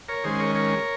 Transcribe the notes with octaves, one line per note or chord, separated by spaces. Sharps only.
A#4 C#5
D#3 G#3 C#4 G#4 C5
A#4 C#5
A#4 C#5